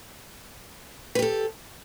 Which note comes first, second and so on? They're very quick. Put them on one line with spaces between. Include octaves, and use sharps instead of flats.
B4 G4 A4